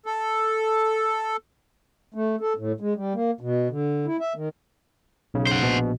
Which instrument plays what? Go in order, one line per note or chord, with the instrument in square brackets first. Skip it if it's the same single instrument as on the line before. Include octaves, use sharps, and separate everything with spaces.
[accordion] A4
[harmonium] A3
A4
A2
G#3
G3
A#3
B2
D3
E4
E5
D#3
[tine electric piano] B1 C#3
[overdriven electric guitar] C5 F#5
[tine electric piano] A#1 B2